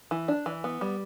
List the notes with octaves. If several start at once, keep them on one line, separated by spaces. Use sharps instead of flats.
E3
D4
E3
B3
G3